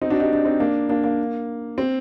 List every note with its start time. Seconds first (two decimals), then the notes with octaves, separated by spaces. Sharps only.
0.02 C4 D#4
0.10 D4 F#4
0.20 D#4 G4
0.33 D4
0.45 C4 D#4
0.60 A#3 D4
0.89 A#3 D4
1.04 A#3
1.78 C4